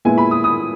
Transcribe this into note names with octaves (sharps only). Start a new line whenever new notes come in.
A#2 G#3 B3 E4 G#5
B5
D#6
D#6